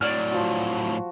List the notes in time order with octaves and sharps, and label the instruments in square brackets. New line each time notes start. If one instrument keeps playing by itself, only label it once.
[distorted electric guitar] A2 F#3 [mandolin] D5 F6
[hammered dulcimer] F3 F#4